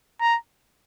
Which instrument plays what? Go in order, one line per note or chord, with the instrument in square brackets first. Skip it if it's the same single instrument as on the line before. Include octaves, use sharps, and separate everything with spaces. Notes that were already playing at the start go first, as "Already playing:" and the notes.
[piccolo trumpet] A#5